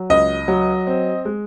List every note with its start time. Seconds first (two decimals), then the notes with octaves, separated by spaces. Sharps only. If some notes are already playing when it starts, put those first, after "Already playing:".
Already playing: F#3
0.10 C#2 D#5
0.48 F#3
0.87 C4
1.25 G#3